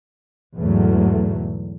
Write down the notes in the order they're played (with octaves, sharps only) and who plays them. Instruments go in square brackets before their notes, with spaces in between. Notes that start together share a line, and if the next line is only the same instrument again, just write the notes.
[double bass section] E2 G#2 B2 F#3 A3